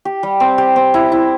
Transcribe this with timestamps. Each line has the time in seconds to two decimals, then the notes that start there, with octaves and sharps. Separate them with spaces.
0.05 G4
0.23 G3
0.40 C4
0.58 G4
0.76 C4
0.94 E4
1.12 E4